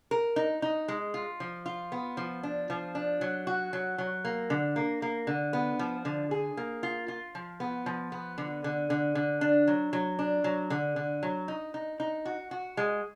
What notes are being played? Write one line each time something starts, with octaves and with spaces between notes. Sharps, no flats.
A#4
D#4
D#4
G#3
F4
F3
F4
B3
F3
D4
F3
D4
F#3
F#4
F#3
F#3
A#3
D3
A#3
A#3
D3
B3
F3
D3
G#4
A#3
F4
F4
F3
B3
F3
B3
D3
D3
D3
D3
D4
F#3
F#3
D4
F#3
D3
D3
F#3
D#4
D#4
D#4
F#4
F#4
G#3